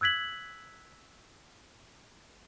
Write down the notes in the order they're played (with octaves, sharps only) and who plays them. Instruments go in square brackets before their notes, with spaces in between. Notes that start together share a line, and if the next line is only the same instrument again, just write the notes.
[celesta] E6 F#6 G#6 B6 F#7